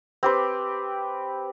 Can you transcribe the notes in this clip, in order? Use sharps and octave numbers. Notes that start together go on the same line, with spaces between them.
C4 G4 B4